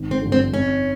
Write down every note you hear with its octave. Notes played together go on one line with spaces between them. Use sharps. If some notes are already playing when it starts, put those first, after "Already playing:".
Already playing: G#1
C4
G2 D3 F3
C4
F2 C#4